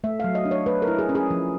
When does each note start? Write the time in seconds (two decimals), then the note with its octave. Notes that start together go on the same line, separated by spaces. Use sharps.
0.04 A3 E5
0.20 F5
0.24 F#3
0.35 D#5
0.45 D4
0.51 C#5
0.66 A3 B4
0.82 A#4
0.88 E4
0.99 G#4
1.09 C#4
1.15 G#4
1.30 F3